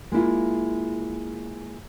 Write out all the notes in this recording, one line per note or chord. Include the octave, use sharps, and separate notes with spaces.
G#3 A#3 E4 F4